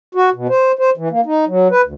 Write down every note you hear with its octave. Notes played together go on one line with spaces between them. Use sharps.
F#4
B2
C5
C5
E3
A#3
D#4
F#3
B4
D2